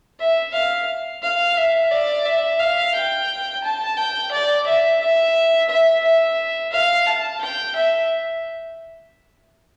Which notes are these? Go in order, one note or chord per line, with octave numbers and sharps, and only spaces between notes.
E5
F5
F5
E5
D5
E5
F5
G5
A5
G5
D5
E5
E5
E5
E5
F5
A5
G5
E5